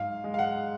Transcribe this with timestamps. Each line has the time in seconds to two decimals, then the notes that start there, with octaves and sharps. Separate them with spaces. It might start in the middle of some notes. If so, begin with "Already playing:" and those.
Already playing: G#2 F#3 F5
0.24 G#3
0.34 F5
0.39 F#5